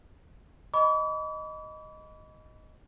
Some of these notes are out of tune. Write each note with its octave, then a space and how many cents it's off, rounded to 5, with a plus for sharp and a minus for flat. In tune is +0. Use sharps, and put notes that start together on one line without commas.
D#5 +0 B5 +0 D6 -45